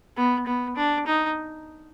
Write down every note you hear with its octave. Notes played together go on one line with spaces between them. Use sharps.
B3
B3
D4
D#4